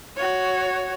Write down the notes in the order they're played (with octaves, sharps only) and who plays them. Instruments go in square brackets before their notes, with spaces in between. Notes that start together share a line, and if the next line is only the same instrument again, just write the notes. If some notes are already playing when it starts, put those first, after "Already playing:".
[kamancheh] F#4 C#5